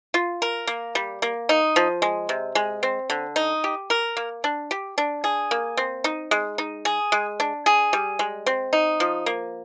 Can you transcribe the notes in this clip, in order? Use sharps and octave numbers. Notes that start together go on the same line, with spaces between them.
F4
A#4
A#3
G3
A#3
D#4
F3
G#3
C3
G#3
C4
D3
D#4
G4
A#4
A#3
D4
G4
D4
G#4
A#3
C4
D#4
G#3
D#4
G#4
G#3
D4
G#4
G3
G#3
C4
D#4
F3
A#3